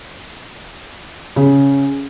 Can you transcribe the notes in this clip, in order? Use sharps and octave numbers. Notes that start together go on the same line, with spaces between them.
C#3